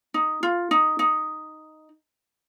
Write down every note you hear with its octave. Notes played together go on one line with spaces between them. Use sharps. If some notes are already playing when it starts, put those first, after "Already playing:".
D#4
F4
D#4
D#4